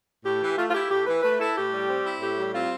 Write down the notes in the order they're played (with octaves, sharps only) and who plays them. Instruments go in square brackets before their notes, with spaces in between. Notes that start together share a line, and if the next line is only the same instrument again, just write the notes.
[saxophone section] A2 G4
E3
A3 F4
F4
E4 G4
A2 G4
E3 B4
A3 B4
E4 A4
A2 G4
G3
C4
E4
A2 G4
G3
C4 F4